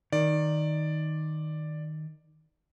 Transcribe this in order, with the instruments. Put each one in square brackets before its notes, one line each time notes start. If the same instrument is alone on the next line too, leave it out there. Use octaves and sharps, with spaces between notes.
[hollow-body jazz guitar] D#3 [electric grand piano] D5